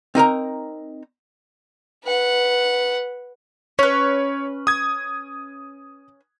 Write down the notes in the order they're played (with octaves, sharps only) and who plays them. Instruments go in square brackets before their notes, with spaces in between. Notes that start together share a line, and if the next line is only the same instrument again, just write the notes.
[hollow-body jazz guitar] C4 D#4 A#4 A#5
[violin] B4 F#5
[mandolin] C#4 B4 [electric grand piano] C#5
[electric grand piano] D#6 G#6